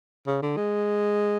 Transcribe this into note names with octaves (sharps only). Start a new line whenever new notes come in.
C#3
D3
G#3